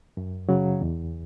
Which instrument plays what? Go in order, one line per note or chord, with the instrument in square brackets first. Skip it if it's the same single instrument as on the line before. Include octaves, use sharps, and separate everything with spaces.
[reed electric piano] F#2
C#3 F#3
E2